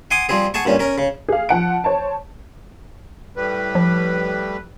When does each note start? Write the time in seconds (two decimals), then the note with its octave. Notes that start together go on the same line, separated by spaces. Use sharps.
0.11 F#5 G#5 C6 D6 D#6
0.29 F3 G3 C4 G#4
0.54 G#4 F#5 A5 C#6
0.65 G2 A#2 C#4
0.79 C#4 A#4
0.98 C#3
1.29 G#4 F5
1.49 F3 F#5 D7
1.84 C5 C#5 A5
3.36 A2 G3 B4
3.75 F3